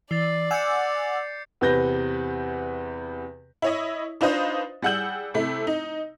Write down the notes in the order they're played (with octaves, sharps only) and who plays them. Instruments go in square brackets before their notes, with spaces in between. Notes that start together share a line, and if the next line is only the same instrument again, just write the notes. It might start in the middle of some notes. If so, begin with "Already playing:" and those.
[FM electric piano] E3 [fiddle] D5 [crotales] A6 C7
[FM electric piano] F#5 G#5 E6 [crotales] D6 G6 C#7
[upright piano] E2 C3 B4 G6 A#6
[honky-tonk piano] E4 C#5 D#5
D4 D#4 F4 B4 C5 D#5
G3 G#4 F#5 E6 G6 F#7
C3 A3 E4
D#4